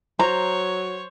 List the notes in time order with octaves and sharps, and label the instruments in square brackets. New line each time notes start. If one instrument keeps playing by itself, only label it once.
[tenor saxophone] F#3 [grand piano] C5 [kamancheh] C#5 [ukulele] A#5